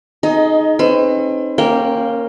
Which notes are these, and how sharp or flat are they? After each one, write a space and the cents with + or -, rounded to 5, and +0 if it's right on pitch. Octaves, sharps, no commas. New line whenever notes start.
D#4 +0 G#4 +35 D#5 +20
C4 +40 B4 +45
A#3 +0 C#4 -15 G5 +0